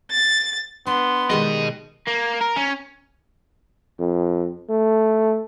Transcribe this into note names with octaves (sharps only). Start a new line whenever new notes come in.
A6
B3 D4 C6
B2 D#3 G3 G#3 D#5
A#3
A#4
C#4
F2
A3